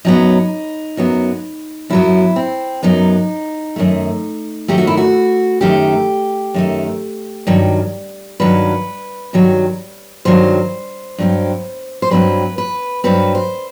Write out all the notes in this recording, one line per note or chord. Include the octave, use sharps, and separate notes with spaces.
F#2 F#3 B3 D#4
F#2 F#3 B3
F#2 F#3 B3 E4
C4
F#2 F#3 B3 D#4
F#2 D#3 A3
F#2 D#3 A3 G4
F#4
E4
F#4
F#2 D#3 A3 G4
F#2 D#3 A3
G2 D#3 F#3
G2 D#3 F#3 B4
G2 D#3 F#3
G2 D#3 F#3 C5
G2 F#3 C4
C5
G2 F#3 C4 B4
B4
G2 F#3 C4 B4
C5